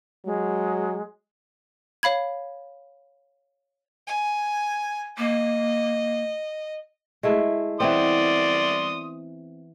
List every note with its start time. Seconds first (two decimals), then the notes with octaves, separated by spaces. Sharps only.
0.25 F#3 G#3
2.03 C#5 F5 B5 G#6
4.07 G#5
5.18 A#3 D#5
7.23 G#3 A3 E4
7.80 E3 B3 C4 D5 C6 D#6